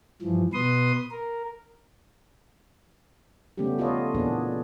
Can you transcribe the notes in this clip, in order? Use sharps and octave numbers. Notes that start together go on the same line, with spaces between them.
G2 E3 F3
B2 B4 C6 D#6
A#4
C#3 G3 A3 B3 C#4 G4
B3 F4 A4 B4 C#5 D#5
A#2 E3 A#3 B3 D4 G#4